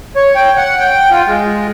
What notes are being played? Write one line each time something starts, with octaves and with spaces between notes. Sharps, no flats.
C#5
G5
F#5
G5
F4
G#3